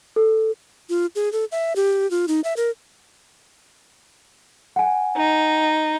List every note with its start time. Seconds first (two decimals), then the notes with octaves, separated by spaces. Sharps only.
0.16 A4
0.89 F4
1.15 G#4
1.32 A4
1.52 E5
1.76 G4
2.11 F4
2.28 D#4
2.44 E5
2.57 A#4
4.76 F#5 G#5
5.16 D#4